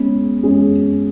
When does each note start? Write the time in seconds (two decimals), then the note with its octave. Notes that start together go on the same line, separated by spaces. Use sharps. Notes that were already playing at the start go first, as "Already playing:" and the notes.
Already playing: G#3 B3 C#4 G#4
0.43 G#3 C#4 G#4